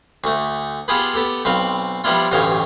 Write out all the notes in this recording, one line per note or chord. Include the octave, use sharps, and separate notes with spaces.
D2 A3
B3 F4 G4 G#4 B4
B3 G4 A4
B1 C4 B4 F5
F3 G3 B3 D4 E4 F4
A1 D2 G2 C5 C#5 F5